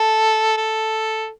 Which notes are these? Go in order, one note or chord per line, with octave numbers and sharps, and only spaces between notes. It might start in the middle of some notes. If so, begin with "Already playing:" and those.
Already playing: A4
A4